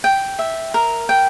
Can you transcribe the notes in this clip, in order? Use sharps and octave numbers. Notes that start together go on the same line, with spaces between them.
G5
E5
A#4
G5